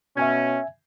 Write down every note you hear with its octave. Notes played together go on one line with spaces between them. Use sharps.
B2 C#4 E5 G#5 G#6